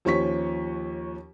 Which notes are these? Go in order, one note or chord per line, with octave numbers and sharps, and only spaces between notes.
D#2 F3 C#4 C#6 B6